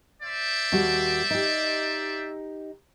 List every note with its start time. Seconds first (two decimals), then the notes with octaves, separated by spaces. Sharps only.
0.23 C5 D5 E5
0.72 D#2 G3 F#4
1.31 D#4 G4